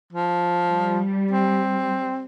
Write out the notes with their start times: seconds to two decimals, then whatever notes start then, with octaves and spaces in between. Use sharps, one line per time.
0.13 F3
0.65 G3
1.31 C4